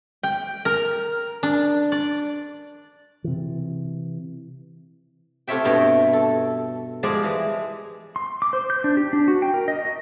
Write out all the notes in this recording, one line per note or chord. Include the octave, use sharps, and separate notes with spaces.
G5
A#4
D4
D5
C3 E3
C3 A3 F4 C#5 E5 G5
G2 B2 C#5 G5
A4
F3 G3 G#3 G#4 C5 D5
E3 G#3
C6
D6
C5
G6
D4
G4
D4
F#4
G5
A#4
D#5
D#5